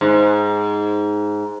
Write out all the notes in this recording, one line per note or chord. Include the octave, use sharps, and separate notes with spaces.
G#2